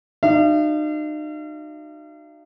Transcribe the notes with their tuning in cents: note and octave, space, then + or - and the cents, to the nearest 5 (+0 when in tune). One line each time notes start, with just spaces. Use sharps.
D#4 -40 F#4 +0 F5 -45